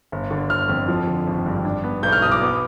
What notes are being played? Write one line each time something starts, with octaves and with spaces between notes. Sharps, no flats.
G1
D3
G1 F6
F2
F3
D3
G#1
G2
D4
B3
B1 G6
F6
B2 D#6
D6
B3